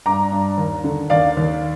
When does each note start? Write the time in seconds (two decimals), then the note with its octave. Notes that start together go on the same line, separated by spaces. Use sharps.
0.06 G2 A#5 D6
0.32 G2
0.58 D#2
0.84 D3
1.10 D#2 D5 F5
1.37 D#2